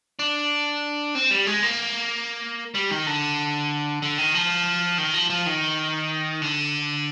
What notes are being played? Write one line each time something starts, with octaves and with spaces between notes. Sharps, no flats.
D4
C4
G3
G#3
A#3
G3
D#3
D3
D3
D#3
F3
D#3
F3
F3
D#3
D3